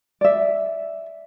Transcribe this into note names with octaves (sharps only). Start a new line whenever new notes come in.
D5 E5